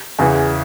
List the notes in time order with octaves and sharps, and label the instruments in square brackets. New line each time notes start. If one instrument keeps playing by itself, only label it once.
[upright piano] E2 C#3 E3